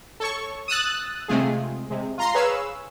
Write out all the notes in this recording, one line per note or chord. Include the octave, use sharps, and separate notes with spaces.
A4 C#5 C#6
D#6 E6 F#6 A6
C3 G#3 A3 F4 G#4
C3 G#3
F4 A#5 C6
G#4 B4 C#5 F5 E6